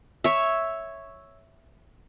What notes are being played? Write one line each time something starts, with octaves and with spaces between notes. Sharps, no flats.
C#5 E5